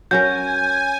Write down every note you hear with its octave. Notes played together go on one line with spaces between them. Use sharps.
F#3 C#4 A#4 G#5 G6